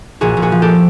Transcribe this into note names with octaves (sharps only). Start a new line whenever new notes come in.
A#1 F#4 G#4
A#1
F#4 G#4
F3
G4 A4